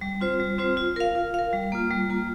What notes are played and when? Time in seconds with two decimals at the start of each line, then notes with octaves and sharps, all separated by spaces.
0.01 G3
0.21 C4 F4 C5
0.40 G3
0.58 C4 F4 C5
0.77 F4
0.96 A#4 F5
1.15 F4
1.34 A#4 F5
1.53 G3
1.72 A#3 F4
1.91 G3
2.10 A#3 F4